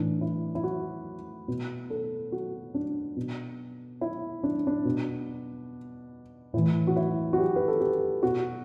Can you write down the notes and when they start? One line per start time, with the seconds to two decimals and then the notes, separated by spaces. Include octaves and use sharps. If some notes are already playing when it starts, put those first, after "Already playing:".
Already playing: A2 E3 D4
0.21 E4
0.55 E4
0.63 F#4
1.48 B2
1.90 A4
2.32 F#4
2.74 D4
3.16 B2
4.01 E4
4.43 D4
4.67 D4
4.85 B2
6.53 A2 E3 E4
6.87 F#4
6.96 E4
7.33 F#4
7.38 G4
7.56 B4
7.68 A4
7.80 G4
8.23 B2 F#4